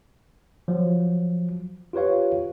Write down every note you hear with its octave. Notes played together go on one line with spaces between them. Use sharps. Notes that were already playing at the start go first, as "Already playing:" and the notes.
F3 F#3
F4 G4 B4 C#5 F5